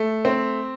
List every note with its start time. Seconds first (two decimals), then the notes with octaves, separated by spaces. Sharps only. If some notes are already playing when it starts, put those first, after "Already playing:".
Already playing: A3
0.25 C4